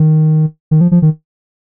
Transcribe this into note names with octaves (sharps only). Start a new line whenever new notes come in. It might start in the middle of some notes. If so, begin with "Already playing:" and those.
Already playing: D#3
D#3
F3
F3
D#3